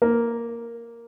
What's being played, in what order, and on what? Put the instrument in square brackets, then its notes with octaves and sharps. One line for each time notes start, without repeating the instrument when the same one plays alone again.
[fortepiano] A#3